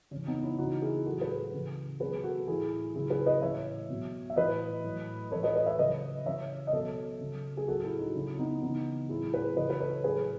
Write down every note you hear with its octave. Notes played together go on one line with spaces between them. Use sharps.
C#3 E3 C#4
B3 D#4
C#4 E4
C#3 E3 D#4 F#4
E4 G#4
A2 F#3 F#4 A4
G#4 B4
C#3 E3
B2 F#3 G#4 B4
F#4 A4
A2 E3 E4 G#4
C#3 F#3 E4 G#4
G#4 B4
B4 D#5
A2 E3 C#5 E5
B2 F#3
E5
A2 E3 B4 D#5
A2 F#3
A2 E3 A4 C#5
B4 D#5
B4 D#5
C#5 E5
C#3 F#3 B4 D#5
C#3 E3 C#5 E5
D#5
B2 F#3 A4 C#5
C#3 F#3
G#4
A2 F#3 F#4 A4
E4 G#4
D#4 F#4
C#3 F#3 C#4 E4
B3 D#4
C#3 E3 B3 D#4
A2 F#3 E4 G#4
G#4 B4
C#3 E3 B4 D#5
B4
A4 C#5
A2 F#3 G#4 B4